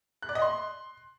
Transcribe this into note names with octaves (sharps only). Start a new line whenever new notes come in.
F#6
D5
D#5
C6